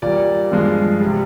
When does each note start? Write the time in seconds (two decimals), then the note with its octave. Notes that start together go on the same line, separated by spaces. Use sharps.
0.02 A#2 G3 D5
0.52 G2 F3 G#3
1.01 G3
1.06 C3